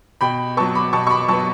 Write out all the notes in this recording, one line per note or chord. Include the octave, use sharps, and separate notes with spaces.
B2 G5 B5
F#3 B3 A5 C#6
B5 D6
B2 A5 C#6
C#6
B5 D6
F#3 B3 A5 C#6